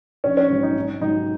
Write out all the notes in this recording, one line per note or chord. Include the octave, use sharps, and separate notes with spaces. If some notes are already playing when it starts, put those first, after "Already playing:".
A#1 C#4
C#4
G#2 D#3 F#3
D#4
G#1
G#2 D#3 F#3 D#4